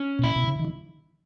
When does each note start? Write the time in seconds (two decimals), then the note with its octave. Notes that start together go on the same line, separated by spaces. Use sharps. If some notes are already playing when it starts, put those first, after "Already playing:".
Already playing: C#4
0.19 B2
0.24 A#2 E4
0.36 B2
0.48 C#3
0.59 D#3
0.65 E3